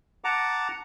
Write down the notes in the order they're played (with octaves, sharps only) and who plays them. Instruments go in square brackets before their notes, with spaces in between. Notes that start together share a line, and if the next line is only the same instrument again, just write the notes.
[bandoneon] F#5 A5 A#5 D6